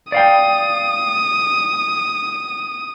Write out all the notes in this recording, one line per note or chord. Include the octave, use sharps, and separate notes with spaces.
D5 F5 G5 D#6